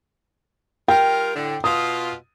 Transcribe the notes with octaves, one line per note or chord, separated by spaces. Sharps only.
G3 F4 A#4 G5
A2 D3
B2 F4 D#6